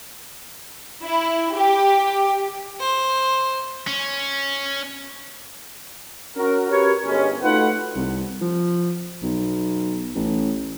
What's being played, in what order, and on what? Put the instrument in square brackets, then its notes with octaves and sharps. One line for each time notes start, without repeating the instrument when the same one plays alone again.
[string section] E4
G4
[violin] C5
[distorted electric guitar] C#4
[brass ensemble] C#4 F#4 A#4
F#4 G4 A#4 B4 C#5
G1 G#3 C#4
A3 D#4 F4 F#4 B4 F#5
[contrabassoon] C2
F3
B1
A1